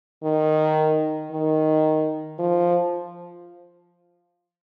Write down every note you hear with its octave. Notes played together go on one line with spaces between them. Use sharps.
D#3
D#3
F3